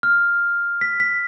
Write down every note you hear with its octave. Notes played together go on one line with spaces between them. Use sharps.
F6
B6
B6